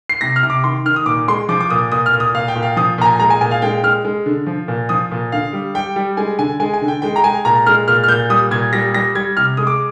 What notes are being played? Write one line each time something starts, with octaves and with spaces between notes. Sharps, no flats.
C7
C3 A#6
F6
C3
D6
D#3 C6
D#3 F6
D#6
A#2 D6
G#3 C6
F3 D6
D6
A#2 D#6
A#2 D#6
F6
A#2
D#6
A#2 F5
G5
A#2
F5
F3 D#6
A#2 A#5
G#5
G#3 A#5
G#5
A#2 G#5
F5
G#3 G5
G#3 F6
G#3
D3
F3
A#2
F3 D#6
A#2
D3 F5
G3
G3 G5
G3
G#3 G#5
D3 G#5
G#3 G#5
G#5
D3
G5
G#3 G5
A#5
G#3 G#5
A#2 A#5
G#3 F6
A#2 F6
F6
A#2 G6
G3 D#6
A#2 G#6
G3 A#6
G3 A#6
G3 G#6
C3 F6
G#3 D#6
D6